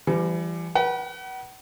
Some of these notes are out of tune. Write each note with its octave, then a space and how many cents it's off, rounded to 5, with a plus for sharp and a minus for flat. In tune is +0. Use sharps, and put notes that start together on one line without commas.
E3 +40 G3 +0
B4 -35 F#5 +35